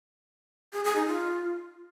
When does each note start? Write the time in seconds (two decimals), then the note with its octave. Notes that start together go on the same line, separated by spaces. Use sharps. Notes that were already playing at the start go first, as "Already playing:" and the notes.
0.73 G#4
0.84 G#4
0.96 D#4
1.07 F4